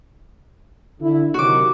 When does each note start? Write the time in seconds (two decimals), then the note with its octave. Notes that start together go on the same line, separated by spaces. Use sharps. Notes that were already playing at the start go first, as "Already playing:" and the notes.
1.00 D3 E4
1.34 C3 D#3 F#3 F#4 D6